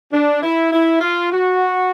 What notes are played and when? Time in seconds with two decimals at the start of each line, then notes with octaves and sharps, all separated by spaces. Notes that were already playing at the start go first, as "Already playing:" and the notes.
0.13 D4
0.43 E4
0.72 E4
1.01 F4
1.32 F#4